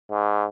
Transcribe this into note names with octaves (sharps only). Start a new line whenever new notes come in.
G#2